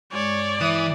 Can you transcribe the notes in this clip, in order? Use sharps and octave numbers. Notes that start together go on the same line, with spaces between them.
G2 G#3 C#5 D5
E3 E5 D#6 F#6